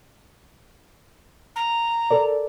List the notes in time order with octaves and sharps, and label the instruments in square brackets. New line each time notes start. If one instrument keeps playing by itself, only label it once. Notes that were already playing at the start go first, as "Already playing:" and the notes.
[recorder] A#5
[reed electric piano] A4 A#4 D5